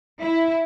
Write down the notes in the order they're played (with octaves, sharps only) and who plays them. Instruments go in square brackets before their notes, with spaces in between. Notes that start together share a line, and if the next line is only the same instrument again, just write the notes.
[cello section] E4